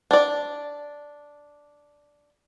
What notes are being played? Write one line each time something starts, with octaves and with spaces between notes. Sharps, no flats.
D4 D5